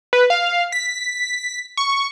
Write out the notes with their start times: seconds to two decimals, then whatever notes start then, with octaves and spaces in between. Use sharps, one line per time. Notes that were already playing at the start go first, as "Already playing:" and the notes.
0.13 B4
0.30 F5
0.72 B6
1.77 C#6